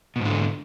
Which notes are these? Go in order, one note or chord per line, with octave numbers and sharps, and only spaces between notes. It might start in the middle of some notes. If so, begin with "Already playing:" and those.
G#2 B2 D3